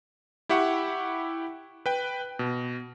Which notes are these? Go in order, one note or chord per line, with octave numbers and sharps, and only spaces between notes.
E4 G4 E5 F#5 C#6
B4 G5
B2